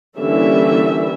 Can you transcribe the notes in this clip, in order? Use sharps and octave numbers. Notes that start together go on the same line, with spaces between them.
D3 E3 G3 A#3 C#4 E5